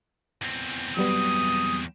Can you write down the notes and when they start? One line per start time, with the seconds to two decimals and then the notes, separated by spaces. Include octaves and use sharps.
0.42 E2 C4
0.97 F#3 G3 B3 D#6